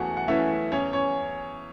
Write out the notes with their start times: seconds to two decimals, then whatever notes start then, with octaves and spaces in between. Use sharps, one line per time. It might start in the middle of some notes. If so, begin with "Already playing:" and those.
Already playing: E2 E3 A3 C#4 F#4 F#5 A5
0.17 F#5
0.28 E3 A3 C#4 E4 E5
0.72 E2 C#4 C#5
0.93 C#4 C#5